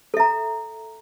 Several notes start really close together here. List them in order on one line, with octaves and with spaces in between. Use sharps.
A4 E5 A#5